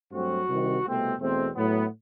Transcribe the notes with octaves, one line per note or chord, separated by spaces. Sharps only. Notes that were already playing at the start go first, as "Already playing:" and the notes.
G2 F#3 A3 C4 F#4
C2 C3 D#3 G3 C4
C2 B2 A3 C4
E2 B2 A3 C4
A2 F#3 B3